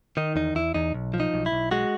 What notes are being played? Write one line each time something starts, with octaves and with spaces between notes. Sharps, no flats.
D#3 D#4
E2 D#4
E2 E4
E2 D#4
B1
F3
D#4
B1
E4
B1
G#3 F#4